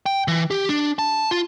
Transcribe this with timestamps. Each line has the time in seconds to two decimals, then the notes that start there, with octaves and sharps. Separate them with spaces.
0.06 G5
0.28 E3
0.51 G4
0.69 D4
0.99 A5
1.31 F4